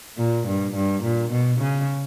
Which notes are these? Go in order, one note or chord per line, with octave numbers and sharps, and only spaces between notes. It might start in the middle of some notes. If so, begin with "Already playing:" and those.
A#2
G2
G2
A#2
B2
C#3